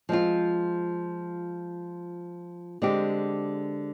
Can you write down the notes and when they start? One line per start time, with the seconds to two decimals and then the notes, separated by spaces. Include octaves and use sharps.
0.09 F3 G#3 C4 F4
2.82 D3 G#3 C4 G4